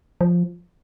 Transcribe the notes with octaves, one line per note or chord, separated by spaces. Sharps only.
F3